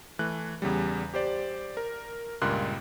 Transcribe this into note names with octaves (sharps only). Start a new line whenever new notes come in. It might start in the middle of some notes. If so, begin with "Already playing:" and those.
E3 A3 F#6
E2 C#3 G3
G4 C5 D5
A#4
C#2 G2 A#2 A#3 C6 F#6